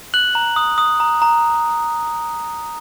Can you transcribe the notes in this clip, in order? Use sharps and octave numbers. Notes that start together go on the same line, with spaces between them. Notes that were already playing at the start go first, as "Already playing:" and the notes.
F#6 F#7
A#5
D#6
D#6
A#5
A#5